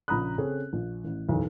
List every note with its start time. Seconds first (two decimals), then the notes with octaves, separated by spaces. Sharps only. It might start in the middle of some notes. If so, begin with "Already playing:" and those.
0.08 A#1 C#3 A#5 B5 D#6 F#6
0.38 C#3 C4 C#4 G#4 A4
0.73 A#1
1.04 A1
1.28 F#1 B1 E2